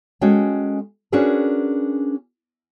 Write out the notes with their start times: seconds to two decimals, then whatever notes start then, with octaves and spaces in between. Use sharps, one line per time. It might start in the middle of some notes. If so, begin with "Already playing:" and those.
0.21 G#3 C#4 F#4 A4 G5 G#5
1.12 C#4 D4 F#4 G#4 A#4 B4